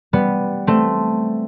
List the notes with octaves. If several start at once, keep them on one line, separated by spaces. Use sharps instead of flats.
G3 B3
A3 C4